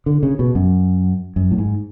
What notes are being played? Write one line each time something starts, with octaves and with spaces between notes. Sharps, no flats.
D3
C#3
B2
F#2
F#2
A2
G#2